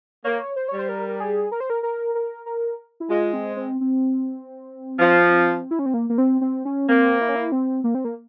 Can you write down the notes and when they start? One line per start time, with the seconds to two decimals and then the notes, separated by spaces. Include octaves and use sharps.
0.24 A#3 C#5
0.56 C5
0.68 G3 C#5
0.79 C5
0.89 A#4
1.08 A#4
1.20 G#4
1.52 A#4
1.60 C5
1.70 A#4
1.83 A#4
2.15 A#4
2.46 A#4
3.00 E4
3.09 G#3 F4
3.33 C4
3.57 C4
3.81 C4
4.99 F3
5.71 E4
5.79 C#4
5.86 C4
5.94 A#3
6.10 A#3
6.18 C4
6.41 C4
6.65 C#4
6.89 A#3 C4
7.21 E4
7.29 C#4
7.35 E4
7.52 C4
7.84 A#3
7.95 C4
8.05 A#3